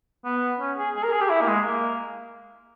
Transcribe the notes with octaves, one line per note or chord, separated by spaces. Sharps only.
B3
C#4
G#4
G#4
A#4
G#4
G4
E4
A#3
G#3
A#3